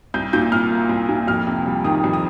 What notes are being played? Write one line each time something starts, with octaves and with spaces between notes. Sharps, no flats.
C2 G6
A#2 G6
C2 F6
A#3
C2
A#2
F2 F6
C3
G3
D#3 D#6
F2
D#6